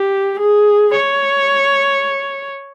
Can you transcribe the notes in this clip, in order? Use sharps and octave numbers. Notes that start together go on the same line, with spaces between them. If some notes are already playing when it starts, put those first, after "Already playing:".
Already playing: G4
G#4
C#5